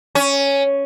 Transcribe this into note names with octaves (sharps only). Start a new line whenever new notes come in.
C#4